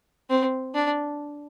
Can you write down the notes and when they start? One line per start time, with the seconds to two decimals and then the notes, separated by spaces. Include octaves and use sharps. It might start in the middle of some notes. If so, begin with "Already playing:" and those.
0.30 C4
0.74 D4